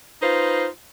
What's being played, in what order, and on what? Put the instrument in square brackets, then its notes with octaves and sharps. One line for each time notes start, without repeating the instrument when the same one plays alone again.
[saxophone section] D#4 F4 B4 C5